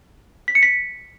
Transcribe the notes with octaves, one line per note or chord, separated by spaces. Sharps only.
B6
C#7
B6